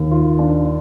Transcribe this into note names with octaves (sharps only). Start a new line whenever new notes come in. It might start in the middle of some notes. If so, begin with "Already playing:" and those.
Already playing: D#2 D#3
F4
D4